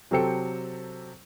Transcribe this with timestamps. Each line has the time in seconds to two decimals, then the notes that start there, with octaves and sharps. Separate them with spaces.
0.11 C3 F#3 C4 A4 G5 C#7